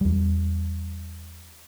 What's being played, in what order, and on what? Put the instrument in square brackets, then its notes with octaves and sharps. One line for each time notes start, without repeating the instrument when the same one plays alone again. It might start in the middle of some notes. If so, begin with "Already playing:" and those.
[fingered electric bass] E2 G3